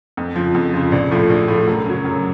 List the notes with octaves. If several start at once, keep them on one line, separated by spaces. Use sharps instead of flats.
F2
C#3 F3
F2
C#3 F3
A#1
A2 F3 A3
A#1
A2 F3 A3
F#2
C#3 F#3
F#2